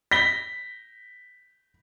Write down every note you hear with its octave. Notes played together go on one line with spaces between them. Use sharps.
A#6 B6 G7